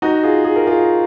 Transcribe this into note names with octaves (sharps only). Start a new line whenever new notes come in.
D#4 F#4
F4 G#4
G#4
A#4
F4 G#4